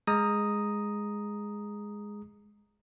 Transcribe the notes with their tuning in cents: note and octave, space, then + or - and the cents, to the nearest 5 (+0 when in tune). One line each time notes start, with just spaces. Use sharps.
G#3 +0 A#5 +0 D#6 +0